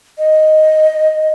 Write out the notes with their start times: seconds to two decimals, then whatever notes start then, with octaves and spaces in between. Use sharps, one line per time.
0.18 D#5